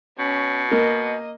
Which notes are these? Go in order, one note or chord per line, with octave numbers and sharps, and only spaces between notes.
B2 C#4
A#3 D#5